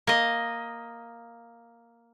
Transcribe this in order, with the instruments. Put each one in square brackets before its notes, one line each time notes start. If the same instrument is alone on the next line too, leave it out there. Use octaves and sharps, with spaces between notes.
[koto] A#3 D#5